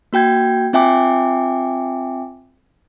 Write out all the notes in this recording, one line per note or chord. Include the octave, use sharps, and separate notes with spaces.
A#3 F#4 G5 G6 G#6
C4 F4 E5 G5 G#5 D6